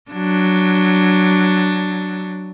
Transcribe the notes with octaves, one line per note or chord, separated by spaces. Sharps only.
F#3 D4